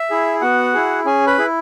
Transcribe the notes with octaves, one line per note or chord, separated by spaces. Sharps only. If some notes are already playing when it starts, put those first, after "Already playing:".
Already playing: E5
E4 G#4
B3 F#4 F#5
E4 G#4
C#4 G#4 G#5
B4 B5
E4 G#4